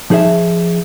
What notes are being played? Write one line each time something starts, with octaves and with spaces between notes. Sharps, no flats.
F3 D#4 G#4 C5 E5